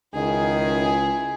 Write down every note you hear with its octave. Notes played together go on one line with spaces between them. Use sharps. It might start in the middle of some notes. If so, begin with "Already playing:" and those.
C#2 D#3 E4 G#4